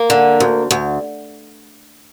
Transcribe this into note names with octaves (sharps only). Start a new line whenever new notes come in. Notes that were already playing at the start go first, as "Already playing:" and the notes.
Already playing: A#3
D3
D2
D2